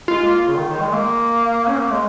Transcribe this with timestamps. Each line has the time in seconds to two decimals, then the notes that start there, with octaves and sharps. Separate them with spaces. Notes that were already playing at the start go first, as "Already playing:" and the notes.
0.08 G#3 F4
0.24 A#3
0.47 C#3
0.57 D#3
0.69 D#3
0.81 G#3
0.93 A#3
1.67 C#4
1.79 A#3
1.91 G#3